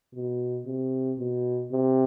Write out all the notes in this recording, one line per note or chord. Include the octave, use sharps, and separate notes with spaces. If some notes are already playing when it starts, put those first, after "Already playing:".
B2
C3
B2
C3